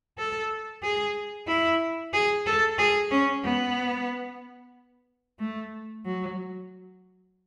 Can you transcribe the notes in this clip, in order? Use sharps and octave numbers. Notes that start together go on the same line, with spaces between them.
A4
G#4
E4
G#4
A4
G#4
C#4
B3
A3
F#3